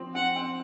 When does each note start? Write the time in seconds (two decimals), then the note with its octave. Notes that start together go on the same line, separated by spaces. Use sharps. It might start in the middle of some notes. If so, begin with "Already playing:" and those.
Already playing: F3 C4
0.15 C4 F#5
0.36 C4